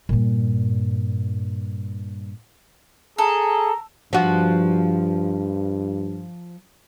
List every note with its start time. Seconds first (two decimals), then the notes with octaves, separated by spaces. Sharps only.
0.09 G2 A#2
3.18 G#4 A4 A#5
4.13 G2 F3 F#4